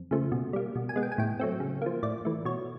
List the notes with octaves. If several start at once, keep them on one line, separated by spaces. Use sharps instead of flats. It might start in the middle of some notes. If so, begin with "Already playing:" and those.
Already playing: F2
C#3 F3 A3
B2
G3 A#3
B2
G#5
G#3 B3
G5
G#5
A2 G5
F#3 A3 C4
C#3
F3 A#3
A2 D5
E3 A3
B2 C#5